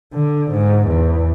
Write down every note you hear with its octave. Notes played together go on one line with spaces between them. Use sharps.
D3
G#2
E2